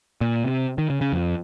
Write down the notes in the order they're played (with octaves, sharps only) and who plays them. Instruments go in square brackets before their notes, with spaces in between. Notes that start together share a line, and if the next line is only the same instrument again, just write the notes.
[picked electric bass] A#2
C3
D#3
C#3
C#3
F2